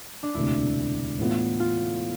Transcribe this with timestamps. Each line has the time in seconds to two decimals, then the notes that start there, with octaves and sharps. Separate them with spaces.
0.23 D4
0.34 E1 D2 C3 E4
1.19 A2 E3 B3 F4
1.60 F4